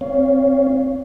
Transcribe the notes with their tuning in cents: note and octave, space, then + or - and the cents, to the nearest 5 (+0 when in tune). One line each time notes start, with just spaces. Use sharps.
C4 +15 C#5 +25 F5 +0